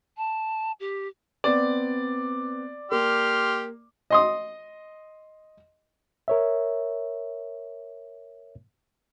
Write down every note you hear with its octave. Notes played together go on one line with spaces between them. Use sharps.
A5
G4
B3 C4 D5
A#3 G4 C6 F6
D#5 C6 D#6
A#4 C#5 E5